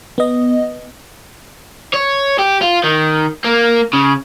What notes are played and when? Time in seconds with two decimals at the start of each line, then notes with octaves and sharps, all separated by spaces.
0.18 B3 D#5
1.93 C#5
2.39 G4
2.62 F4
2.84 D#3
3.45 A#3
3.93 C#3